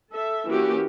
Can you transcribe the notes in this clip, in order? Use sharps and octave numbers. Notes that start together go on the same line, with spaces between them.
A4 E5
E3 A#3 C#4 F#4 G4